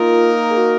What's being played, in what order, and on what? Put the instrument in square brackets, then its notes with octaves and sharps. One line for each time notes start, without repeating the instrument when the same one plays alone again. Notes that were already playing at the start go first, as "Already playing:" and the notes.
Already playing: [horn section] A#3 D#4 A#4 [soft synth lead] F4
[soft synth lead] G#4
F#4